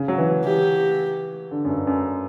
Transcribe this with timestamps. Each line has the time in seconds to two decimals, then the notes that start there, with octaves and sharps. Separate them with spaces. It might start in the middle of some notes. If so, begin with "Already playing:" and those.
Already playing: C#3
0.08 F#3
0.18 E3
0.44 E3 G4
1.51 D3
1.65 F#2
1.69 G2
1.87 F#2